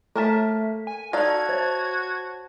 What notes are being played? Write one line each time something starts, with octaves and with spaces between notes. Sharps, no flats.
A3 A#3 A4 A#4 A5 B6
G#5
D#4 F#4 A4 D5 F5 A5 G#6
C5 C#5 A5